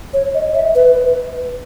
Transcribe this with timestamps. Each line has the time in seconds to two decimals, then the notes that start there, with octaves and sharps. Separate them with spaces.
0.14 C#5
0.34 D#5
0.55 E5
0.75 B4
0.95 B4